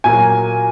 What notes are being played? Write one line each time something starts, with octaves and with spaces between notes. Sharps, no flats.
A#2 F#3 A#3 G#5